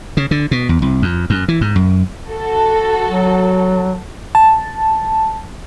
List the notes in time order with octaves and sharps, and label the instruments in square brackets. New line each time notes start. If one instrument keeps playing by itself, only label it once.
[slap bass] C#3
D3
B2
E2
C2
F2
F#2
E3
G#2
F#2
[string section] F#4 A4
[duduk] F#3
[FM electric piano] A5